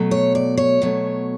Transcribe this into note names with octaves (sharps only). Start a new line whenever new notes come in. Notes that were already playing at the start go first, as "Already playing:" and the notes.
Already playing: B2 F#3 A3
C#5
D5
C#5
B2 F#3 A3